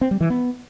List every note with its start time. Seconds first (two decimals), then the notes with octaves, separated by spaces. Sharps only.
0.01 C4
0.11 G3
0.21 E3
0.30 B3